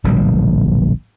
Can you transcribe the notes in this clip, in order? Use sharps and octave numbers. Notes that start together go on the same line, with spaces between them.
D1 A#1 B2 G3